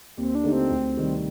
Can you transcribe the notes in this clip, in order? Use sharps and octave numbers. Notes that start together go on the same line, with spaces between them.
D#2 C4
D4
D3 A3 D#4 G4
C4
D2
C3 D#3 G3